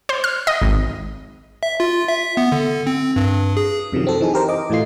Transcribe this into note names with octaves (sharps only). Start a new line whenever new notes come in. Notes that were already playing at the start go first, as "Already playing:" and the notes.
C5
F6
D#5
G#1
E5
F4
E5
B3
D3
C4
G2
G2
G#4
F#2 C3 D#3 F3 F#3
C4 A4
E3 D#4 G#4
G4 A#4 C5
D#5 D6
A2 E3 A3 F4 C7